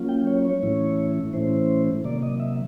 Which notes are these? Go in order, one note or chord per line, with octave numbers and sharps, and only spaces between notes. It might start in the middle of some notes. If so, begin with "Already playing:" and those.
Already playing: F#3 A#3 C#4 F4
G5
C#5
C#5
A2 E3 A3 C#4 E4
A2 E3 A3 C#4 E4 C5
C3 D#3 F#3 A#3 D5
D#5
E5